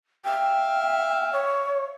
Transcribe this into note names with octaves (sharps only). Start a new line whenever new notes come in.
E5 F5 G5
C#5